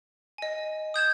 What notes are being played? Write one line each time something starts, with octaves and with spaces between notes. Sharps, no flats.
D#5 G#5
D#6 G6 G#6 E7